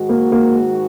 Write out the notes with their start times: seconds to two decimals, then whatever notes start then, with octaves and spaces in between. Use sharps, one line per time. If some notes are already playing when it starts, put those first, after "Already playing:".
Already playing: G#2 D#3 G#3 F#4
0.09 A#3
0.32 A#3